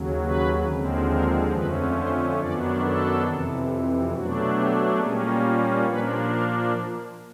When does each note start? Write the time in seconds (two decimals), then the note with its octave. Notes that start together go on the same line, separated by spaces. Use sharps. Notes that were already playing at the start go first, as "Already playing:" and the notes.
Already playing: D#2 C#3 F#3
0.23 B4
0.67 D#2 D3 F3 G#3 C4
1.11 A#4
1.54 F2 D3 F3 A3 C#4 B4
1.97 C5
2.40 F#2 D#3 F#3 B3 D4 D5
2.83 A4
3.27 F2 C3 E3
4.13 B2 F#3 A3 D4 F#4
4.56 G4
5.00 A#2 G3 A#3 C#4 G#4
5.87 A#2 F3 A#3 D4 B4
6.30 A#4